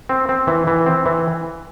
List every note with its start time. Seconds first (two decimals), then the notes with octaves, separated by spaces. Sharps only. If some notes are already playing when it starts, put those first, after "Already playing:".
0.09 C4
0.29 C4
0.47 E3
0.67 E3
0.86 C4
1.06 E3